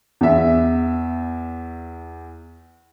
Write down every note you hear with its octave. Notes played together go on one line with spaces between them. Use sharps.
E2 E5